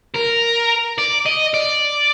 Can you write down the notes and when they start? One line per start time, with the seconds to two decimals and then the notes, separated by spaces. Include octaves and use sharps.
0.16 A#4
0.98 D5
1.26 D#5
1.54 D5